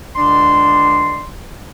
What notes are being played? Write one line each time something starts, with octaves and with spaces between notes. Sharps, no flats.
C#2 D3 D4 D5 C6